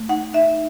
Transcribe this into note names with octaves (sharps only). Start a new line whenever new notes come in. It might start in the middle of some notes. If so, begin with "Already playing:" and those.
Already playing: A3
D#4 F#5
D#4 E5